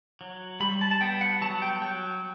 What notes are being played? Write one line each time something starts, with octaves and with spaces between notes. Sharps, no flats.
F#3
G3 B5
A5
A5
B3 G5
F#5
F#3 A5
G5
F#3 G5